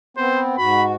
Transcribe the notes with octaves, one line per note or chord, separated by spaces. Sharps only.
B3 C4 C5
G#2 F#4 B5